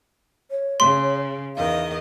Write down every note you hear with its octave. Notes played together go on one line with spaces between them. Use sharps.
C#5
C#3 C6
E2 D#3 D#5 F5